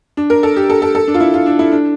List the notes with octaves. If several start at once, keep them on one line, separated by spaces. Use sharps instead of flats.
D4
A#4
A4
G4
A4
A4
A4
D4
F4
E4
F4
D4
E4
D4